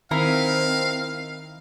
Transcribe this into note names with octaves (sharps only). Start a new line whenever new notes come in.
D#3 C4 D#4 E4 A#4 F5